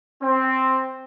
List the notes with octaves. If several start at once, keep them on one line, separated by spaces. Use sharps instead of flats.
C4